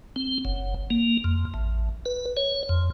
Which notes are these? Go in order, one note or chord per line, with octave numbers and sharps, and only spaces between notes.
C4
F#1
A#3
F2
A1
B4
C#5
F2